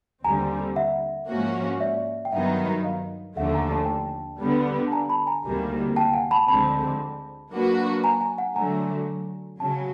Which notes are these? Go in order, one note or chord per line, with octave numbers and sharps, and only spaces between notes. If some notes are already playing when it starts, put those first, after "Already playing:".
D#2 D3 G3 C4 G#5 A#5
E5 F#5
G#2 F3 A#3 C#4 F#4
D5 E5
G5
G2 D#3 F#3 B3 D#4 E5 F#5
D#5 F5
D#2 D3 F3 A3 E5 F#5
G#5 A#5
A5
G#5
G5 A5
D3 G3 B3
A5
G#5 A#5
A5 B5
G#5 A#5
D2 C3 D#3 G3 A#3
G5 A5
F#5 G#5
A5 B5
D2 D3 F3 G#3 C4 A5 B5
F#3 A#3 D4 F#4 B4
G#5 A#5
G#5 A#5
F#5 G#5
D3 F#3 A3 G#5 A#5
C#3 F#3 A5
G#5